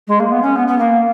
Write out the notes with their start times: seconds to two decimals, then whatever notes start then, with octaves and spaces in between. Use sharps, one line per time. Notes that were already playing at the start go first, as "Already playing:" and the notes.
0.07 G#3
0.19 A#3
0.31 B3
0.42 C#4
0.55 B3
0.67 B3
0.78 A#3